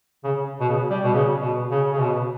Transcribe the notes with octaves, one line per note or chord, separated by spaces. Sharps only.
C#3
B2
C#3
G3
B2
C#3
B2
C#3
C#3
B2